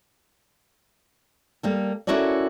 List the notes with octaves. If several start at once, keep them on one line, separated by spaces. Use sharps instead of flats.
G3 A#3 A4
C#4 E4 F#4 A4 A#4 D5